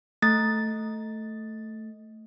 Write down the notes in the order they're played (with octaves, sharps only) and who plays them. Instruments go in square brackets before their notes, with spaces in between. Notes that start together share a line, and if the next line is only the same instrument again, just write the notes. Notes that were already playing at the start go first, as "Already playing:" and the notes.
[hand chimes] A3 A6